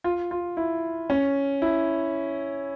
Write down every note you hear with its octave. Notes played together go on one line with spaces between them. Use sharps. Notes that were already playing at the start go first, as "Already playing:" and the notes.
F4
F4
E4
C#4
E4